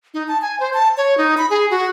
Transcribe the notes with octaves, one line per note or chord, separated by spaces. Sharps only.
D#4
A5
G#5
C5
A5
C#5
D#4
B5
G#4
F#4